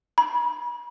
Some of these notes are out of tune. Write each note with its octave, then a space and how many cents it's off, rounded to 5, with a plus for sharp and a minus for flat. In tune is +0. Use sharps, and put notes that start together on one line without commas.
B5 -40